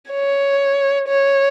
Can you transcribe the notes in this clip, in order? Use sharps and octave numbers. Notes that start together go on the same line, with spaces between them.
C#5
C#5